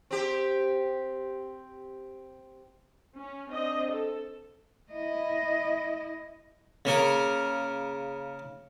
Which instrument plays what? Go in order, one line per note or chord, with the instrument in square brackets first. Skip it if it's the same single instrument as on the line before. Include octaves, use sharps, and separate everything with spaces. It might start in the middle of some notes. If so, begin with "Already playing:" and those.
[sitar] C4 G4
[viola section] C#4
C4 D4 D#5
A4
[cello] E4 D#5
[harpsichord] C#3 A#3 A#4